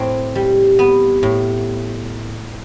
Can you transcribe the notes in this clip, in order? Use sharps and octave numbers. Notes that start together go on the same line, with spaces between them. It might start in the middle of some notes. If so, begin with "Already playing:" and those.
Already playing: A2 C4
G3
B3
A2